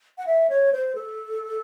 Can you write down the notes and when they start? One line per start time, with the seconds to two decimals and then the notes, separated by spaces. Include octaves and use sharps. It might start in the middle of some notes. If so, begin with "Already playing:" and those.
0.18 F#5
0.27 E5
0.50 C#5
0.73 C5
0.95 A4